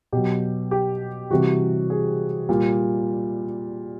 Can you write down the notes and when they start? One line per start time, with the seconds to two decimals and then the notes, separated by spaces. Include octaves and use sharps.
0.12 B2 F#3 G4
0.71 G4
1.30 C3 E3 G3 F#4
1.90 G#4
2.49 A#2 G3